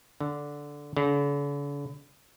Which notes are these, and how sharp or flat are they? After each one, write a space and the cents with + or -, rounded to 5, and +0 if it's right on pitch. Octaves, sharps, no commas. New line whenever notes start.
D3 -10
D3 -45